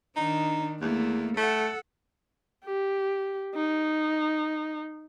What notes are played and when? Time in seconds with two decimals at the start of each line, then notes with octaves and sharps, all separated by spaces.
0.16 D#3 D4 D#4
0.81 E2 A3 A#3
1.38 A3 A4 F#5
2.65 G4
3.55 D#4